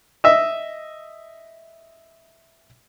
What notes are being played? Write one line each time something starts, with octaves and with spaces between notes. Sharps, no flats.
D#5 E5